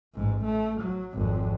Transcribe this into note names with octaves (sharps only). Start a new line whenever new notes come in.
A1 G#2
A3
F#3
G#1 F2